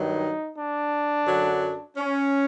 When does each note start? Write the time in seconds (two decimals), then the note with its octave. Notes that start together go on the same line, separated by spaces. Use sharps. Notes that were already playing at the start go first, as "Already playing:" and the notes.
Already playing: G2 D#3 F#3 D#4
0.55 D4
1.26 F#2 D3 F#3
1.97 C#4